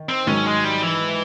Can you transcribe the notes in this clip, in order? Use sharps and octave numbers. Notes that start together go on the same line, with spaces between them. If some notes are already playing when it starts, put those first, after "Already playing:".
Already playing: D#3
C4
G#2 D#3 F#3 C#4
G#3
G3
E3